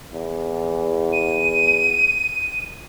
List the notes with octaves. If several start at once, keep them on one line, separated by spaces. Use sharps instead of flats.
E2
D#7